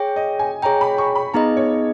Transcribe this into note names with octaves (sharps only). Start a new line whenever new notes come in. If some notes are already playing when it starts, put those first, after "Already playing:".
Already playing: G#4 C#5 G5
D#5
G#5
G#4 C#5 G5 A#5
B5
C#6
B5
B3 D#4 G#4 D#5 A#5
C#5